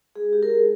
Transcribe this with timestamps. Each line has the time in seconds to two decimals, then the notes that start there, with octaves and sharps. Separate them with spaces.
0.16 G#3 G#4
0.33 G4
0.43 A#4
0.50 D#4 G#4